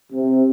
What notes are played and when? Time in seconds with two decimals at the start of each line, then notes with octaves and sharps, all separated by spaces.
0.12 C3